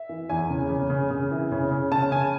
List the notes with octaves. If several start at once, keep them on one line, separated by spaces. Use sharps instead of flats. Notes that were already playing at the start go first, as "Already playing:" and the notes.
Already playing: E5
E3
E2 G#5
C#3
C#3
C#3
C#3
E3
C#3
C#3
C#3 A5
C#3 G#5